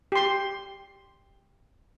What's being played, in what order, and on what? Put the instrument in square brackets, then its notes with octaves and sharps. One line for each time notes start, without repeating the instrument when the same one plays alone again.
[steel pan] G4 C6